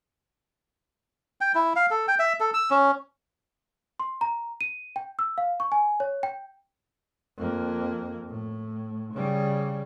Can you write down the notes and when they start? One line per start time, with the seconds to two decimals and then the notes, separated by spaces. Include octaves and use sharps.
1.41 G5
1.55 E4
1.76 F5
1.91 A4
2.08 G5
2.19 E5
2.40 A4
2.54 E6
2.71 C#4
4.00 C6
4.21 A#5
4.61 D#7
4.96 G5
5.19 E6
5.38 F5
5.60 C#6
5.72 G#5
6.00 C#5
6.23 G5
7.38 F2 A#3
8.29 A2
9.13 C#3 G3